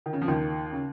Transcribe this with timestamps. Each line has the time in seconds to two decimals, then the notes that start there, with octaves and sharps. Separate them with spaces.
0.06 D#3
0.13 C#3
0.21 F3
0.28 D#2 D#3
0.72 C#3